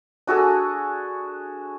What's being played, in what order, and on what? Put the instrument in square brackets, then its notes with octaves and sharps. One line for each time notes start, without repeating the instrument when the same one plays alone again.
[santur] D4 F#4 G#4 A4